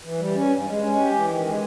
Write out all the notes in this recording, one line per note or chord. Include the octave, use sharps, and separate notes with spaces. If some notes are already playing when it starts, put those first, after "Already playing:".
E3
G3
C#4
G2
G#3
C#4
G4
E3
D#3
G#3